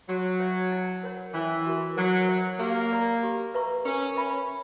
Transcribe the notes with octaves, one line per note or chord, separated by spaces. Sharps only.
F#3 F#4
C#5 E5
E4
A#4 C#5 F#5
E3 C#4
F#4 A#4
F#3 A#4
C#5 E5
A#3 G4
A#4 D5 A#5
G4
B4 E5 A#5 C#6
C#4 A#4
E5 B5